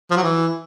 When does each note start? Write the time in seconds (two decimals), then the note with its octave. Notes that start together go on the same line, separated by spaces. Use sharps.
0.11 F3
0.17 F#3
0.23 E3